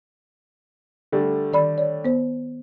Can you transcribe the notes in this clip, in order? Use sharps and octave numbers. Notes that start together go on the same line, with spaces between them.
D3 G3 A3
D#3 D5 B5
C#5 D5
B3 C5